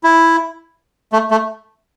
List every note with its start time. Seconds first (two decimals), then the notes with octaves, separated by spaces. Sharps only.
0.04 E4
1.12 A3
1.31 A3